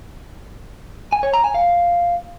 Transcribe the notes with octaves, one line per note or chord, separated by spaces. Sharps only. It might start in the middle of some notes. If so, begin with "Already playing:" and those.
G#5
C#5
A#5
G#5
F5